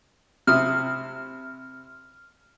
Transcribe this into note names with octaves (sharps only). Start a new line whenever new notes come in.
C3 E4 D#6 F6